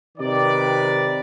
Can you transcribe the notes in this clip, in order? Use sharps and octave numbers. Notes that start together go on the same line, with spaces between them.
C3 D#3 B4 D5